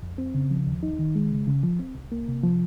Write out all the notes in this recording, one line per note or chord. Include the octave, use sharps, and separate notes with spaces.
F2
C4
C#3
F3
D#2
D#4
D#3
G#3
C#3
C#3
F3
C4
C2
A#3
C3
F3